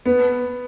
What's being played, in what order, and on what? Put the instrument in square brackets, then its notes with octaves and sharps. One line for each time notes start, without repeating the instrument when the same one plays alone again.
[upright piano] B3